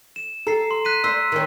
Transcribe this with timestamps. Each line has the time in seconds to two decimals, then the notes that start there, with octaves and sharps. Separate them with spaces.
0.16 E7
0.47 A4 A#5 C7
0.71 C6
0.85 F#6 B6 D#7
1.04 C5 E6 B6
1.32 D#3 C#4